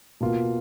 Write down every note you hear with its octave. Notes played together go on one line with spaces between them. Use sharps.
B2 A#3 F4